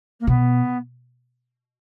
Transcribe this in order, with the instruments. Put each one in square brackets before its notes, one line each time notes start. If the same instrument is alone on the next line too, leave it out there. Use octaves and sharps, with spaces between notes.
[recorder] A#3
[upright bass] B2 [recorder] B3